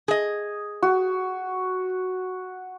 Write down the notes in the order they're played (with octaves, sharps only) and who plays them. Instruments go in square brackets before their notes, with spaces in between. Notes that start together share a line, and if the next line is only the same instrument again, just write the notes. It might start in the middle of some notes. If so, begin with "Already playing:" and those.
[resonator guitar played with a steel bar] G#4 D#5
[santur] F#4